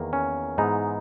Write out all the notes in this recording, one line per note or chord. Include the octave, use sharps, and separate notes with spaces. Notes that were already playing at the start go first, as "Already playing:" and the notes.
Already playing: E2 D#3 A#3
C#4
G#2 E3 G#3 B3 D#4